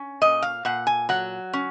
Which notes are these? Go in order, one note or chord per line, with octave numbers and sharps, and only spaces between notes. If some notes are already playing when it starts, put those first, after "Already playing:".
Already playing: C#4
A#2 D#5
F5
A#2 F#5
G#5
F#3 F#5
C#4